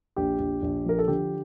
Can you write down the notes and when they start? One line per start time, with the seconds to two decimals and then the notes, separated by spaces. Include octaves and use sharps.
0.16 A#1 G4
0.39 A#1
0.62 A#1
0.86 F3 A#4
0.99 A4
1.08 D3 G4